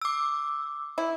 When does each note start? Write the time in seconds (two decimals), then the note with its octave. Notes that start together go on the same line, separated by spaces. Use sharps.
0.01 D6 E6
0.98 E4